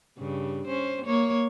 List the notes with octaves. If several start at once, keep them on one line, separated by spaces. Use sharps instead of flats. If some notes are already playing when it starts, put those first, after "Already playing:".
G2 C#3
C#4 C5
A#3 C#5